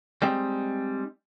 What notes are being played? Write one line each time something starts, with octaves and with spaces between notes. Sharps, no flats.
G3 G#3 C4 D#4